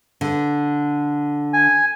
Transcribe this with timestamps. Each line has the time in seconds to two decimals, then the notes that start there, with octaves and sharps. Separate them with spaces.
0.21 D3
1.53 G#5